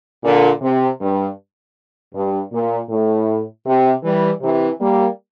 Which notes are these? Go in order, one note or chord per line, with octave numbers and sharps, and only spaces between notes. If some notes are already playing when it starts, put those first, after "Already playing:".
A#2 D3
C3
G2
G2
A#2
A2
C3
E3 G3
C3 E3
G3 A#3